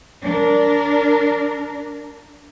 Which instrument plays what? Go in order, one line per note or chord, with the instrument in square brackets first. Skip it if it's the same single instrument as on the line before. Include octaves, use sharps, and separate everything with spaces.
[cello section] D4 A#4